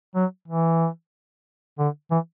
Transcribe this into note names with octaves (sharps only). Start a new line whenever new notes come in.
F#3
E3
D3
E3